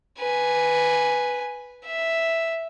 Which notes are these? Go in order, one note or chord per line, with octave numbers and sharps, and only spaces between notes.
B4 G#5
E5